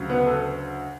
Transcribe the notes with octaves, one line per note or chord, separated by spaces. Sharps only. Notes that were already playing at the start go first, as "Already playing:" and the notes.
Already playing: D2 C#3 F#3
B3 B4
A4